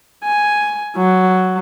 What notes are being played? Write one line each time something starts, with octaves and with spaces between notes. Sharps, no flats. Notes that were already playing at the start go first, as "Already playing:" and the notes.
G#5
F#3